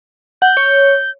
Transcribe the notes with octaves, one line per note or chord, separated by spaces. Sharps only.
F#5 G6
C#5